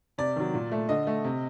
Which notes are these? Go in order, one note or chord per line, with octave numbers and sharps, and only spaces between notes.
C3 D5
D#3 F#3
A#2
A3
D3 D#5
A3
C3